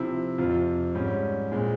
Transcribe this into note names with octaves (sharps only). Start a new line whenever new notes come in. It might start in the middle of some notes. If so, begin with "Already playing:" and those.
Already playing: C3 F3 C4 E4
F2 C3 F3 C4 F4
G#2 G3 C#4
A#2 G#3 C4